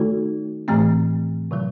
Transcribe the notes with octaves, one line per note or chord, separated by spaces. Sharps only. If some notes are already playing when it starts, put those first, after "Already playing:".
Already playing: D#3 A3 D#4 F#4 A4
A2 E3 A3 C4
C3 D#3 F#3